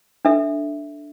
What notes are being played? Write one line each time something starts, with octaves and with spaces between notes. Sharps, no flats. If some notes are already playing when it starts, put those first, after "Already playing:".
D4 A4 E5